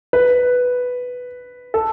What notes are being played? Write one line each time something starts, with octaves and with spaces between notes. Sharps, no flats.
B4
A4